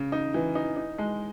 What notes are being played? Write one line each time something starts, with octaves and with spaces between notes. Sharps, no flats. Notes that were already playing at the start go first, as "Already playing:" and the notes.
Already playing: C#3
D#4
E3
D#4
D#4
G#3